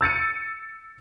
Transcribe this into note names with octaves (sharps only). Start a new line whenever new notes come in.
E6 A6 C#7 D#7